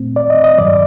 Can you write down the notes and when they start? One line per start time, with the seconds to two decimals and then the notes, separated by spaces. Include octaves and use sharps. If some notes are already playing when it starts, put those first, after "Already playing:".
Already playing: A#2 A3 C4
0.16 D5
0.30 D#5
0.44 D#5
0.57 G2 D#3 F#3 D5